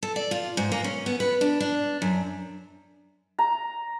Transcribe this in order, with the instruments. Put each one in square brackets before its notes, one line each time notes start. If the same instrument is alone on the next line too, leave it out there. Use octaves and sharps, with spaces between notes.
[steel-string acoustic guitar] A4
D5
F4
G#2
A#3
C#4
B3
B4
D4
D4
F#2
[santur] A#5